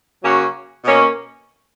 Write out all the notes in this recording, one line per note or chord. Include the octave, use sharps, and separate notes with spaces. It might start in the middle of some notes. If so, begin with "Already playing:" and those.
C#3 F#3 A#3 C#4 F#4
B2 A#3 C#4